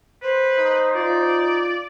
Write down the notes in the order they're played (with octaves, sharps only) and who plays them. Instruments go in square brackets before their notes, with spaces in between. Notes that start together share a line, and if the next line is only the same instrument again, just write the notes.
[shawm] B4 [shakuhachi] C5
[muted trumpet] D#4
[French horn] F4 [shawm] D5